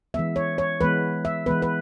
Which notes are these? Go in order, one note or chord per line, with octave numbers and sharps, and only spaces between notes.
E3 G#3 B3 E5
C#5
C#5
E3 G#3 B3 B4
E5
E3 G#3 B3 B4
B4